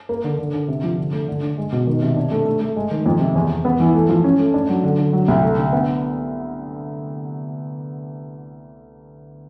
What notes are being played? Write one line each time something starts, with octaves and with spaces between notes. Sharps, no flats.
A#3
D3
D3
D3
C3
F3
D3
A3
D3
D3
G#3
B2
D#3
C3
D4
A3
A3
A3
G#3
D#3
F2
C3
E2
E2
B3
E3
A3
F3
C#4
A3
D4
F#3
D3
D3
F#3
C2
A3
D3
B3